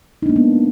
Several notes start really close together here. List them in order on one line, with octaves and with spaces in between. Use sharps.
D#4 D4 A#3 G#3 B3